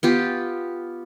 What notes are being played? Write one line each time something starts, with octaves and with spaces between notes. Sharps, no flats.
B3 F4 G4